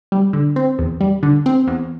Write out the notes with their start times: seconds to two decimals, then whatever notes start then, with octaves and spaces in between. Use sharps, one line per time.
0.12 G3
0.33 D3
0.56 C4
0.79 E2
1.01 G3
1.23 D3
1.46 C4
1.67 E2